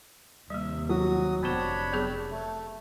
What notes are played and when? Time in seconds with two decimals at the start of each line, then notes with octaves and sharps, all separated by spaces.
0.50 D#2 C3 G3 A#3 E5
0.89 F#3 F#4 D#6
1.43 F1 B3 D4 C5 C#5 B5 A6 E7
1.92 F#3 B3 G#4
2.30 A3